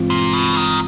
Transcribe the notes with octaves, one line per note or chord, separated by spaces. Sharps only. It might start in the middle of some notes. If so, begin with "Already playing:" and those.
Already playing: G2 E3 G#3 C4 F4
A#2
B2
D#3